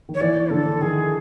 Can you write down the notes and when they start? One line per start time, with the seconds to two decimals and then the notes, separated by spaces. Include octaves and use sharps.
0.09 D#3
0.14 C#5
0.20 E3 D5
0.50 D3 A4
0.81 D#3 G#4